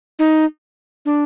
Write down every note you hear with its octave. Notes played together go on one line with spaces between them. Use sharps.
D#4
D4